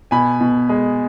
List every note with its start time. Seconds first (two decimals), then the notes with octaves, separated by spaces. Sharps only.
0.11 B2 G#5 B5
0.41 B2
0.69 G#3